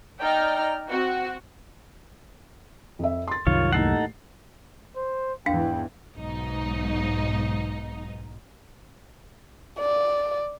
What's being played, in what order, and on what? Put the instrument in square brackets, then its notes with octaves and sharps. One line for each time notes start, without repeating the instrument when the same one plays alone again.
[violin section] D#4 D5 D#5 G5 A#5 F6
C4 F#4
[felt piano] F2 E5
C6 A6
[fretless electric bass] C2 F#2 D#3 [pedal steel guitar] F4 C#5
[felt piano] D#2 A2 C7 [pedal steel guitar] D#4 A4 F#5
[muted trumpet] C5
[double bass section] E2 G#2 E3 [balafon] D4 F5 [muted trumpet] G5
[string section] B1 G#2 D#4
[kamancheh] D5